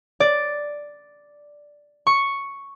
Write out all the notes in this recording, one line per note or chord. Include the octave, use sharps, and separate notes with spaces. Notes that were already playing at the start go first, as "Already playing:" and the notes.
D5
C#6